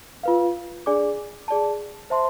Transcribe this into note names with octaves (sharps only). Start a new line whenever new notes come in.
F4 B4 F5
D4 G#4 D5 G#5 D6
G#4 D5 A5
C5 E5 A5 C6